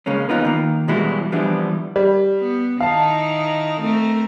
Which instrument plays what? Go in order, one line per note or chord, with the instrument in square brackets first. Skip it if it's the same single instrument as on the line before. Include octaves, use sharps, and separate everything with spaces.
[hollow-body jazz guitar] C#3 G#3 A#3 C#4
E2 C#3 B3 D#4 F4 B4
D#3 A#3
B2 E3 G3 G#3 E4 F#4
E3 F3 G3 B3 D4 E4
[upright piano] G3
[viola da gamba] B3
[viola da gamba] D#3 D#4 E4 [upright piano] F5 A5
[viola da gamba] A3 C4 A#4